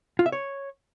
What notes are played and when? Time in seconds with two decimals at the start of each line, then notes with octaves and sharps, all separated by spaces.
0.19 F4
0.26 E5
0.32 C#5